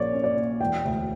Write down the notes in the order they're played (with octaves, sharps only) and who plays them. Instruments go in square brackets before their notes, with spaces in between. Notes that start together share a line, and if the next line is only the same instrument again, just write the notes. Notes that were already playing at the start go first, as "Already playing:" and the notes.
Already playing: [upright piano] A#1 A#2 A#3 C#4 C#5 D5
C#4
D5
A#2
E1 G5
D2